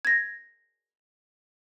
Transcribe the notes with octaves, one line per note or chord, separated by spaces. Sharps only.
G#6 A#6